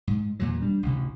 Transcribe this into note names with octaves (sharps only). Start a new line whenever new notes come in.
G#2
E2 A#2 E3 F#3
G3 D4
A1 D2 C3